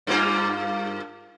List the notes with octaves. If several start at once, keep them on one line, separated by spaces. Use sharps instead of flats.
G2 A#3 F4